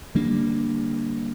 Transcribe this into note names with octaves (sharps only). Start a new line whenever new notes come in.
D3 G3 A#3 D4